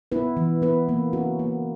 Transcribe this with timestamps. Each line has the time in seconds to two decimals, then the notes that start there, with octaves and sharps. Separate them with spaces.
0.12 B3 E4 B4
0.37 E3
0.62 B3 E4 B4
0.89 A#3
1.13 C#4 F#4
1.39 A#3